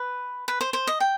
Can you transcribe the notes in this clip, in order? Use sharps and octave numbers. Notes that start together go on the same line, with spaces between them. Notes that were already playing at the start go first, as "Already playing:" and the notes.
Already playing: B4
B4
C5
C5
D#5
G5